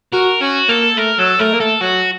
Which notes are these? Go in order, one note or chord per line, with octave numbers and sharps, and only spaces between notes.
F#4 A#4
C#4 F#4
A#3 A4
A3 A#4
F#3 A4
A3 A#4
A#3
A3 A4
F#3 F#4